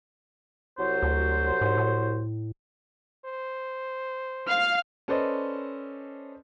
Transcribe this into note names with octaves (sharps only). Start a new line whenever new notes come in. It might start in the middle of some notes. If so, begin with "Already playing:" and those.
C2 F#3 C5
D2
G#2
A2
C5
F5 F6
C#4 A4 B4 C5 D5 D#5